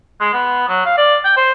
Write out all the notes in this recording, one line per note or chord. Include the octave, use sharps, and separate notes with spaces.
G#3
B3
F#3
F5
D5
G5
C5